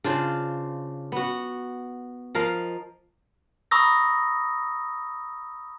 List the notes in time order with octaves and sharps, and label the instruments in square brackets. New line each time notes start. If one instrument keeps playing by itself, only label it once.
[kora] C#3 D4 F4 C5
B3 F#4
F3 A#4 D#5 F5
[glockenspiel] A#5 B5 C#6 D#6 E6 A#6